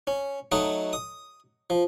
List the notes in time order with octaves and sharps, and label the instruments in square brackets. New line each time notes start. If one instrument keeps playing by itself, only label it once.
[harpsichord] C#4
F#3 A3 D#4 F#4 D#5
D#6
F3